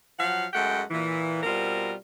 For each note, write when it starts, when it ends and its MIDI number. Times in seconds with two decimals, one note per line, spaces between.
0.19 0.45 53
0.19 0.45 54
0.19 0.45 77
0.19 0.45 78
0.53 0.82 42
0.53 0.82 56
0.53 0.82 57
0.53 0.82 78
0.53 0.82 79
0.91 1.40 46
0.91 1.40 52
1.43 1.93 47
1.43 1.93 55
1.43 1.93 60
1.43 1.93 65
1.43 1.93 70